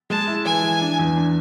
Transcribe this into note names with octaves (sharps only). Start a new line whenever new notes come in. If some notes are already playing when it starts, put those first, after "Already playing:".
G#3 A5
E4
E3 G#5
E3
D4
E2
D4